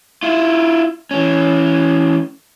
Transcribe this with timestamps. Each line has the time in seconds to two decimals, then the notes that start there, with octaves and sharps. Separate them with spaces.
0.23 E4 F4
1.11 E3 C#4